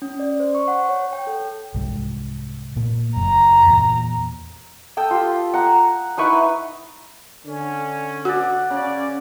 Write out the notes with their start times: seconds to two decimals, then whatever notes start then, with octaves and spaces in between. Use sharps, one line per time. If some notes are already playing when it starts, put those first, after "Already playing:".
0.02 C#4
0.20 D5
0.40 C5
0.55 C#6
0.68 F#5
0.89 C#5
1.13 G5
1.27 A4
1.74 C2 G#2
2.76 A#2 A#3
3.17 F#1 F#2 A#5
3.67 E2 A#2
4.97 A4 G5 D#6 E6
5.11 F4 G4
5.54 F#5 A#5
6.17 D#4 E4 B4 C#6
7.45 D3 C#4
8.25 F#4 D5 F#5
8.70 C#3 C#4 D5